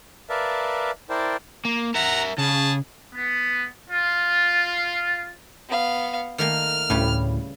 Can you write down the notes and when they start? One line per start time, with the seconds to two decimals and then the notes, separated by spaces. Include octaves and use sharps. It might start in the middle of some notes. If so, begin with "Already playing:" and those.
0.30 A#4 B4 D5 E5 F5 A5
1.10 E4 A#4 C5 D5 G5 A5
1.65 A#3
1.94 A#4 E5 F#5 A#5
2.38 C#3 G#4 A5
3.15 B3
3.90 F4
5.69 B3 F5
6.38 D#3 A3 A#3 F6
6.90 D2 A2 C#3 G3 B4